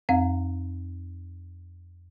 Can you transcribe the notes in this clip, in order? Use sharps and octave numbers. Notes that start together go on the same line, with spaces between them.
F2 C4 F5